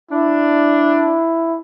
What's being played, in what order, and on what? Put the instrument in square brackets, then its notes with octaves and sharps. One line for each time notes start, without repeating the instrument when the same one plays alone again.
[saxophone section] D4 [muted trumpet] E4